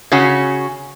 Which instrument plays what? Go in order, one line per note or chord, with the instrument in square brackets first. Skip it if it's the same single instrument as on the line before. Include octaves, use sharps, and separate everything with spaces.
[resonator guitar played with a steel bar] C#3 C#4 F#4